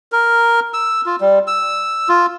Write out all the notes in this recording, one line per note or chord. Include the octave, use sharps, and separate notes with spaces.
A#4
E6
F4
G3
E6
F4